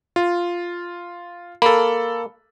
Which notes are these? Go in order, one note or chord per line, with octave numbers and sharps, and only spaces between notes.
F4
A#3 A4 B5